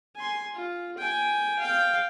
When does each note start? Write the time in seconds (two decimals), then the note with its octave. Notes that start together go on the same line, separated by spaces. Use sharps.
0.16 G#5 C6
0.54 F4
0.98 G5 G#5
1.59 F5 G5